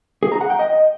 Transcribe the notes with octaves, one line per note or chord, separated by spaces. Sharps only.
G#4
A#5
F#5
G5
D#5